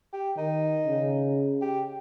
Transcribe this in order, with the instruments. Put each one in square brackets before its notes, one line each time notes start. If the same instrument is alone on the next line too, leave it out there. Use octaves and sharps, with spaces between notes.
[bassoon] G4
[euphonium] D#3 [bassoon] D#4
[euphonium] C#3
[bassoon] G4